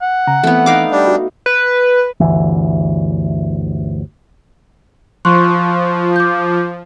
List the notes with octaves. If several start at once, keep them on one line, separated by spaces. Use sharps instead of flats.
F#5
C#3 A#5
E3 A3 B3 C4
D#4 F5 D6
G3 D4
F#4
B4
G1 D2 E3
F3 C6 C#6 F#6
D6 G6